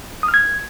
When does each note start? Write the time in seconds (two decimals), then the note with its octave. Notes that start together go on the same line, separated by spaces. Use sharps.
0.23 D#6
0.28 F6
0.34 G#6